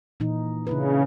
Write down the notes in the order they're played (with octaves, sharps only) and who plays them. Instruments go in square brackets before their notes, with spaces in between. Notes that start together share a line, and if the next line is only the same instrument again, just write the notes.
[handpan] A#2 E3 D#4
[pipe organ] C#3 [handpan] D4 E4 B4